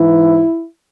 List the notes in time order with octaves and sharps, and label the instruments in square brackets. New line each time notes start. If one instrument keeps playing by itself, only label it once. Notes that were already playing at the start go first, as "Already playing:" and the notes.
Already playing: [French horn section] G#2 E3 E4